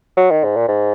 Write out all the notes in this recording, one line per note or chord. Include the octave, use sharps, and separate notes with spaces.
F#3
D#3
G#2
A#2
G#2